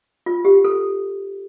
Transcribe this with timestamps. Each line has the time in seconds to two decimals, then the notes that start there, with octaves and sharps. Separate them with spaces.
0.26 F4
0.45 G4
0.65 A4